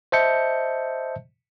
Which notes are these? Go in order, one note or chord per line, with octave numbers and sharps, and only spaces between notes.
C5 D#5 E5 A5 G6 C#7